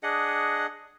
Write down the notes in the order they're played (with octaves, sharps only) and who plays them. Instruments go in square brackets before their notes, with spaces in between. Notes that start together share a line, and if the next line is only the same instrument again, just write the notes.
[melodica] D4 G#4 D#5 F#5